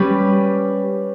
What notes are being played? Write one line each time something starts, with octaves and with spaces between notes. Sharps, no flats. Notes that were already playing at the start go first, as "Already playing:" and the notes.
Already playing: G3 C#4 G4 B4